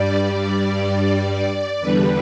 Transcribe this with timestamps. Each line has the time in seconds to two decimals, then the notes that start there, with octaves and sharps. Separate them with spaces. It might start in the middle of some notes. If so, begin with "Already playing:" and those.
Already playing: G2 G3 D5
0.31 D5
1.31 D5
1.80 E2 D3 G3 B4